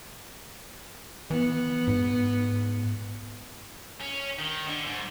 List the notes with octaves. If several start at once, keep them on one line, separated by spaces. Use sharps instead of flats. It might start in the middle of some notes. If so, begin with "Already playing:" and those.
E3 B3
G#2
C#4
D#3
D3
G#2